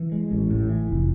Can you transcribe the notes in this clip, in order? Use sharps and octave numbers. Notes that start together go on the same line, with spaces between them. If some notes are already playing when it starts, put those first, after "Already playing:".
Already playing: E3
G#3
A1
A2
E3
F1